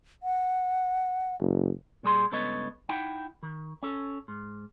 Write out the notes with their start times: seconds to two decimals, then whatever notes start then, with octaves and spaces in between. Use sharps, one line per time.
0.23 F#5
1.40 F#1
2.03 A#2 G3 G#4 C6
2.32 C#2 G2 B3 A4 C#5 D#5
2.89 D#4 E4 F#5 G5
3.43 D#3
3.83 C#4 A4
4.28 G#2